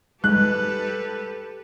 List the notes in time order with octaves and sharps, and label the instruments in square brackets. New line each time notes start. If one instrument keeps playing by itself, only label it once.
[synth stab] G3 G#3 D#4 [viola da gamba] G4 A4 B4 [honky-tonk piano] F#6